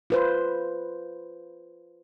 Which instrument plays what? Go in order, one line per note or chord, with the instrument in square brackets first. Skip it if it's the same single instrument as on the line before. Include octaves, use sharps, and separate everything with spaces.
[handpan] F4 B4 C5